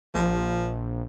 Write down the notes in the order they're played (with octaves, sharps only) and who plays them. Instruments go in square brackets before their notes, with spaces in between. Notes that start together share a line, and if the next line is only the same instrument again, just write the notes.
[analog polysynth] A#1 [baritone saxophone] F3